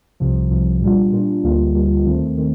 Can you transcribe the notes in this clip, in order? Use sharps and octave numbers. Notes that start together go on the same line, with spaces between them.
C2 C3 F3
C2 C3 F3
A#2 G3 D4 F4
A#2 G3 D4 F4
D2 D3 G3 A#3 F4
D2 D3 G3 A#3 F4
D#2 D#3 A3 C4
D#3 A3 C4